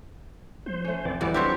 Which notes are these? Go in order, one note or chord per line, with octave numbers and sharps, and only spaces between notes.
F3 C5
A3 C#4
C2 E3 C4 D5
D#2 A2 E3 F#3 G3 G4 D5
F#1 F#3 G3 C4 D4 E4 G4 C#6